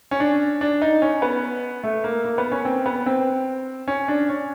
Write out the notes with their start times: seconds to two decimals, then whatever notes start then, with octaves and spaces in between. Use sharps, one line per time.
0.11 C#4
0.20 D4
0.61 D4
0.82 D#4
1.02 C#4
1.22 B3
1.84 A3
2.04 A#3
2.24 A#3
2.38 B3
2.52 C#4
2.65 C4
2.86 B3
3.06 C4
3.88 C#4
4.08 D4
4.29 C#4